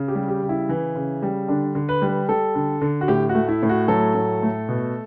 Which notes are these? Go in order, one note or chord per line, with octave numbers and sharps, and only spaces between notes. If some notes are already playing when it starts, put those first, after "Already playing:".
Already playing: C#3
G4
G3
G4
C#3
E4
E3
C#3
G3
D3 D4
D3
B4
G3
B4
G3 A4
D3
D3
F#4
A2 G4
F#4
A3
E4
A2
F#4
F#3 A4
A2
A3
B2